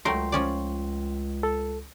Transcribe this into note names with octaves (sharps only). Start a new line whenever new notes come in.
C#2 F#3 A3 A#4 G5 C6
F3 C#4 D5
A4